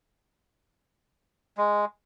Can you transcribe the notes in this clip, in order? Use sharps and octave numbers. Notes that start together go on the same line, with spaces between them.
G#3